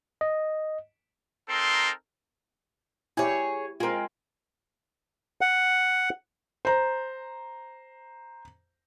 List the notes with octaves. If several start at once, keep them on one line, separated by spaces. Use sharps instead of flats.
D#5
C4 D#4 A4 A#4 C6
E4 G4 G#4 C#5
G#3 C4 F4 A#4
F#5
C5 A#5